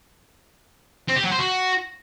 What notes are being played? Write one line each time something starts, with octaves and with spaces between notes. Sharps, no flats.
C4
G4
F#3
C5
F#4